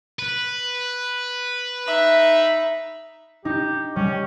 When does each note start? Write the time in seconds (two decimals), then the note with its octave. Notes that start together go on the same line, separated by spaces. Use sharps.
0.19 B4
1.87 D#4 E5
3.45 D#4 G4
3.96 G3 C#4